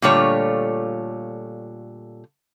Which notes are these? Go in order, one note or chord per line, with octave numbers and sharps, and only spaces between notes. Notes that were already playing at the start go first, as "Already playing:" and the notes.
A#2 D3 G3 A3 F4 C#5